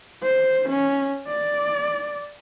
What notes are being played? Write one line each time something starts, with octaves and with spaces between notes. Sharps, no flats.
C5
C#4
D5